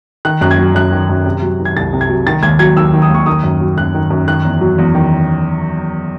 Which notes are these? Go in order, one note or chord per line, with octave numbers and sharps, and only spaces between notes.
D#3 F#6
F#2 F#6
G#6
F#3
F#2 F#6
D#3
F#2
C3
F#3
D#3
G#6
C2 A6
C3
G#6
F#3
D#3 A6
D#2 G#6
F#3 G#6
D#2 E6
D#3
D#6
D#2 C#6
D#3 D#6
F#2
F#3
F#2 F#6
D#3
F#2
D#3 F#6
E2
F#3
E2
D#3